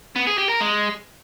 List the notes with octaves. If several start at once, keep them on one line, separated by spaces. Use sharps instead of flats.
B3
G#4
G4
A#4
G#3